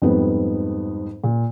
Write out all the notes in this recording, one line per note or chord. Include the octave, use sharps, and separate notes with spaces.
F2 G#2 G3 B3
A#2